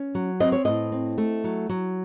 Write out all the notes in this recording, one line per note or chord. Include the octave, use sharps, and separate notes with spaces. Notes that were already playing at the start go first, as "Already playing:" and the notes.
Already playing: C#4
F#3
C4 D#5
C#5
A2 D#5
C4
A3
F#3
F#3